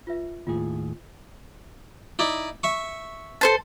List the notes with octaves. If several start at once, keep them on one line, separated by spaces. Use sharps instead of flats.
F4 B4 E5
D#2 A2 F4 G#4
D#4 E4 D5
E5 C#6
A4 C5 A5